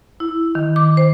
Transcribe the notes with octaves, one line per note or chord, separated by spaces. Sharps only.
E4
D#3
D6
C5